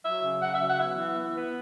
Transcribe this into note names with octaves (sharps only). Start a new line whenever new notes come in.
F#3 E5
C#3
C#3 F#5
E5
F#3
F#5
B3 E5
E3
B3
B3